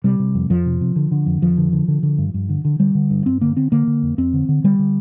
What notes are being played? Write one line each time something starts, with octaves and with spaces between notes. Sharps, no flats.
C3 G3
C3
F2
F2 F3
C3
C3
D3
D3
F2
F2 F3
D3
D3
D3
D3
G2
G2
D3
D3
D3 G3
D3
G2
G2 C4
D3 A#3
D3 C4
D3 A#3
D3
F2
F2 C4
D3
D3
D3 G3
D3